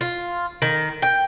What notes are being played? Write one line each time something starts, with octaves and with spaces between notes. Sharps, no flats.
F4
D#3
G5